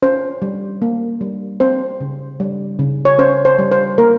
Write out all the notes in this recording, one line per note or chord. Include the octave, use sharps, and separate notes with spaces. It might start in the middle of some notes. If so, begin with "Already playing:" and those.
C#4 C5
G3
A#3
G3
C4 C5
C#3
G3
C#3
C#5
C#4 C5
C5
G3
C5
A#3 A#4